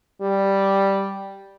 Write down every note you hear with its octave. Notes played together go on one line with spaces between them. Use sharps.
G3